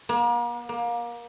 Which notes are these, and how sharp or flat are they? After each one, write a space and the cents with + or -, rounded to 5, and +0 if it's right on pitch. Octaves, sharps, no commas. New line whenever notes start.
A#3 +40
A#3 +25